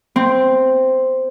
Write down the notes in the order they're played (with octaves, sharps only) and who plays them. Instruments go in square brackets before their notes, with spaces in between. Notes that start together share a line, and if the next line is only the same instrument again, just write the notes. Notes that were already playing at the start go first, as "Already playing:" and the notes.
[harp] C4